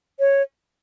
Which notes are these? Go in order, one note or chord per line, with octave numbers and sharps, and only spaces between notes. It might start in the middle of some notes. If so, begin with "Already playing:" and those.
C#5